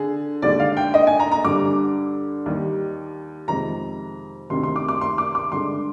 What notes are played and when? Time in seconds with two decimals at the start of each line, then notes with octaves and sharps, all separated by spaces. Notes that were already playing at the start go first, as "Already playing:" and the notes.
Already playing: D3 G#4
0.42 D#2 D3 G#3 D5
0.60 F5
0.77 G5
0.94 D#5
1.07 G#5
1.20 A#5
1.32 A#5
1.44 G2 D3 G3 D6
2.46 D#2 D#3 G3
3.48 F2 C3 D#3 G#3 A#5
4.50 D2 C3 D#3 C6
4.63 C6
4.76 D6
4.88 D6
5.01 C6
5.18 D6
5.35 D6
5.52 G2 D3 G#3 C6